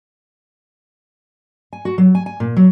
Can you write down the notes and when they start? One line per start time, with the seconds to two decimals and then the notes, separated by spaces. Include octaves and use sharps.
1.73 G#5
1.85 F#4
1.98 F#3
2.15 G#5
2.26 G#5
2.40 A#2
2.57 F#3